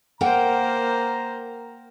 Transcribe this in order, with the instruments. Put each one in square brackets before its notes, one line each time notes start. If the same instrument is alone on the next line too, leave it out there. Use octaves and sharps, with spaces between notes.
[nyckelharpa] A#3 C5 [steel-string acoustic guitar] A#4 F#5 G5 [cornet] A#5